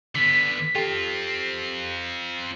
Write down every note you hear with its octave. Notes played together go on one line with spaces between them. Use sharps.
D3 B3 B6
C4 F4 G4 A4 G5